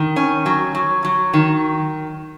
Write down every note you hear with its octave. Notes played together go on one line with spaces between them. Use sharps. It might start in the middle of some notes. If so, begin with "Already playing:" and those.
Already playing: D#3
C#4
F#3
F#3
F#3
D#3